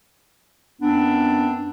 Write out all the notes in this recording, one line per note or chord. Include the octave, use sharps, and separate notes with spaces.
F#2 B3 C4 D4